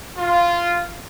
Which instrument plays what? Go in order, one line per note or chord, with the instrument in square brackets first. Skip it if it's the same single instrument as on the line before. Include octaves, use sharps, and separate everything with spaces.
[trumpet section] F4